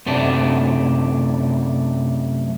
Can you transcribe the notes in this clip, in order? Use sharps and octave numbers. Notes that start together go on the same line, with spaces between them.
F#2 C3 A3 D4